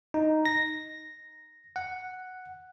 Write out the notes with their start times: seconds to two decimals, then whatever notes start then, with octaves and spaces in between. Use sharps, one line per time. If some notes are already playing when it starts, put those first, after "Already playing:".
0.14 D#4
0.45 A#6
1.76 F#5